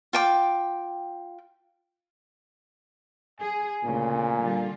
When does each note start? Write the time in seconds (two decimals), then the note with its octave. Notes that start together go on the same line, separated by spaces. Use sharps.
0.13 F4 G5 D6
3.41 G#4 G#5
3.84 D2 A#2 C#3
4.40 D3 G3 F4